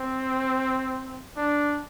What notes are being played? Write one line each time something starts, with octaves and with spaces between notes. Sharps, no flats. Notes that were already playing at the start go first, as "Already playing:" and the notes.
Already playing: C4
D4